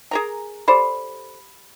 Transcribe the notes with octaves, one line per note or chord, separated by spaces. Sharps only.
G#4 A#4 A#5
G4 A4 C5 D5 B5